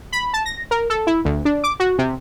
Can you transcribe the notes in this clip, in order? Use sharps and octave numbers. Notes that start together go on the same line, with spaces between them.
B5
A5
A#6
A#4
A4
E4
D2
D4
D6
F#4
C3